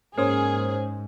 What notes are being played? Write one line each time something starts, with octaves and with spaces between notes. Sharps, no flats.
G#2 A#3 C#4 G#4 A#4 C5 C#5 D#6